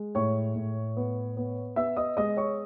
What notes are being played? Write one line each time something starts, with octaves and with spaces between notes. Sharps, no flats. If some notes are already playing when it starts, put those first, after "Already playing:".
Already playing: G#3
A2 C#5 C#6
A2
B3
B3
B3 E5 E6
D#5 D#6
G#3 D#5 D#6
C#5 C#6